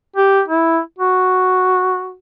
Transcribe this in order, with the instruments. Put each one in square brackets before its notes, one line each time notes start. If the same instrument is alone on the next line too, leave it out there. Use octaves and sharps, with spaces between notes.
[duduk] G4
E4
F#4